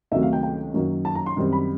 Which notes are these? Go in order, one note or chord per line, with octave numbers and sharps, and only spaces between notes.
C#2 C3 D#3 F#3 A3 E5
F5
G5
G5
F#2 D#3 F#3 A#3
A5
A#5
C6
F#2 D#3 G3 C4
B5